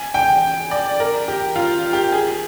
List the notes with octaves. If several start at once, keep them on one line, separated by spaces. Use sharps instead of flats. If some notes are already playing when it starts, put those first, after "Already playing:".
Already playing: G#5
G5
D5
A#4
G4
F4
G4
G#4